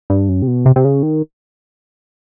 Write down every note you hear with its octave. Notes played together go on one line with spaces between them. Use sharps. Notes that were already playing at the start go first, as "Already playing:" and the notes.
G2
F#2
C3
B2
C3
C3
C#3
D#3